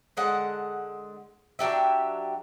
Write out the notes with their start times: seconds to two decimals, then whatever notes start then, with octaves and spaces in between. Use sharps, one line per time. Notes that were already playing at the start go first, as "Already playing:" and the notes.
0.17 D3 G#3 F#5
1.59 F#3 D4 G4 E5